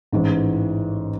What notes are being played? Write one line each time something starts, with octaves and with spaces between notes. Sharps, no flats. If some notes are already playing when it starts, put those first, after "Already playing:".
A1 G#2 E3